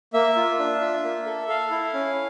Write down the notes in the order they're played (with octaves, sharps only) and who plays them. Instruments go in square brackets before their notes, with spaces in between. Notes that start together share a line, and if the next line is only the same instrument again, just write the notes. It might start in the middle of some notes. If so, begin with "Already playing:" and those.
[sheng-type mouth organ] A#3 E5
F4
D4
F4
A#3
A4
A4 F5
E4
C#4